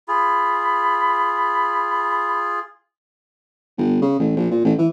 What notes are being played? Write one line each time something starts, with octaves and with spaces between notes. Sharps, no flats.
F4 G#4 B5
G1
C#3
A1
A#1
A#2
A1
E3